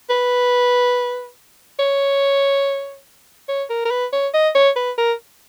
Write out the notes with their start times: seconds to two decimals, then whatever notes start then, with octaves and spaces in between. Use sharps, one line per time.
0.10 B4
1.79 C#5
3.49 C#5
3.70 A#4
3.85 A#4
3.91 B4
4.13 C#5
4.34 D#5
4.55 C#5
4.76 B4
4.98 A#4